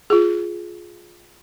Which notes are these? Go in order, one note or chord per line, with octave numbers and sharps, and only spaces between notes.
F4 G#4